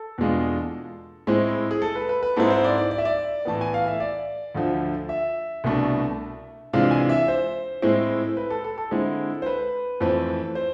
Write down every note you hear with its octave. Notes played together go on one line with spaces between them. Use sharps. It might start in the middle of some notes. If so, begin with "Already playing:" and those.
Already playing: A4
E2 B2 G#3 D4 F4
A2 G#3 C4 E4
G#4
A4
B4
B4
B4
G#2 G#3 C4 E4 A4
C5
D5
D5
D5
E5
D5
A2 E3 B3 A5
G#5
F5
E5
D5
D2 D3 F3
E5
C2 B2 A3 D4
C3 E3 G#3 D4 F4 F5
G#5
E5
C5
A2 G#3 C4 E4
B4
A4
A4
A4
D3 G#3 C4 E4
C5
B4
F2 E3 A3 C4
C5